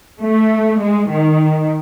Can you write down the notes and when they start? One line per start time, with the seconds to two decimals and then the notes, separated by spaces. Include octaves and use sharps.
0.21 A3
0.81 G#3
1.11 D#3